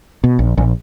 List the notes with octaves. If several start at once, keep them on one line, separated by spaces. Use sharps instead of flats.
B2
A#1
A#1